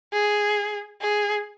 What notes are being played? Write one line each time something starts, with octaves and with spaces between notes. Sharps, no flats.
G#4
G#4